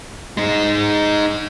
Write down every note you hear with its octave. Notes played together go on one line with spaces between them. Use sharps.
G#3 D#4